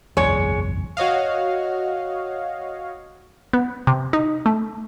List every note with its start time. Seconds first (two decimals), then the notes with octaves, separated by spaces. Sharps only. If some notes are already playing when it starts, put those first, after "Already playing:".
0.17 F#1 B1 E2 G#3 C#5
0.97 F#4 C#5 D#5 F5
3.53 B3
3.87 C3
4.13 D#4
4.46 A3